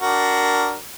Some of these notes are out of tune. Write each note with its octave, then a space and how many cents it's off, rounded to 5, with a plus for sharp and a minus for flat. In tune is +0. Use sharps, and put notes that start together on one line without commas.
D4 +0 F#4 +15 A#4 +0